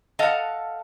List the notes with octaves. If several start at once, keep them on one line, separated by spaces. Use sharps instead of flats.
A4 D#5 F5 F#5 A5